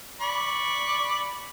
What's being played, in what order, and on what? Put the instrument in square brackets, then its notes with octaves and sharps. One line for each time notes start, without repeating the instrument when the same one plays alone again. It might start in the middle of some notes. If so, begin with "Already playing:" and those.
[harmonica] D5 B5 C#6